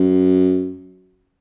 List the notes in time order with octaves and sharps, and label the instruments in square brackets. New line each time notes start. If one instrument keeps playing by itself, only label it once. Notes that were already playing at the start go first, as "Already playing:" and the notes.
Already playing: [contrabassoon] F#2